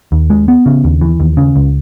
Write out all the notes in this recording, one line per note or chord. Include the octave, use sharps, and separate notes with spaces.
D#2
G#3
B3
C#3
D#2
E3
D#2
C#3
C#2